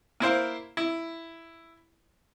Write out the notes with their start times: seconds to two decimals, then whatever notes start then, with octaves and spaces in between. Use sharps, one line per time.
0.20 A#3 E4 C5 F5
0.77 E4